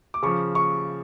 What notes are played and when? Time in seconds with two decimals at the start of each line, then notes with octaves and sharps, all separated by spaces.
0.14 D6
0.23 C#3 F3 C#6
0.55 C#6